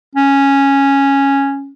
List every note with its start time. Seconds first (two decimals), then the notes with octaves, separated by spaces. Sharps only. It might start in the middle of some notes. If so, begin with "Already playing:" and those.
0.15 C#4